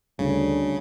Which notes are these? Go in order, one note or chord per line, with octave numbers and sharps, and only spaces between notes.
D2 C#3 G3 D4